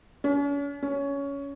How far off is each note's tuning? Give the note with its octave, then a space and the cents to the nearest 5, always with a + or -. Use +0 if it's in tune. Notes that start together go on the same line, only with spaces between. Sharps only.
C#4 +40
C#4 +15